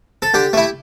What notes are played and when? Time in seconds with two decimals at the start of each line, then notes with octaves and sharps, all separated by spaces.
0.22 A4
0.34 D3 G4
0.53 A3 E4